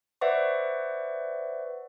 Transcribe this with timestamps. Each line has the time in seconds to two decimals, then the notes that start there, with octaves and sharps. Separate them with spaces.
0.21 B4 C5 D5 E5 F#5 C#6